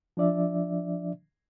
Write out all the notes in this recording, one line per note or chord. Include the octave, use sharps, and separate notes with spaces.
F3 D4 D5 E5